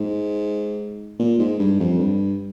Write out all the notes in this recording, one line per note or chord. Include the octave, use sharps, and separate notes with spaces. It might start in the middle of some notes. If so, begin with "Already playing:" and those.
Already playing: G#2
A#2
G#2
G2
F2
G2